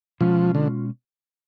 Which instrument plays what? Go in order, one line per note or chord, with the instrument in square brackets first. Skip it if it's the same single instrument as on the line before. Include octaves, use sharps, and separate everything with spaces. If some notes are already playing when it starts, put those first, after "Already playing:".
[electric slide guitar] B2 G#3 C#4 F4 [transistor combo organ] F3
[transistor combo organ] D3